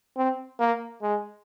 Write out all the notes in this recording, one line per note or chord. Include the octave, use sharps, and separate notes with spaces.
C4
A#3
G#3